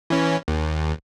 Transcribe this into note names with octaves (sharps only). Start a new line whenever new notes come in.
E3 C#4
D#2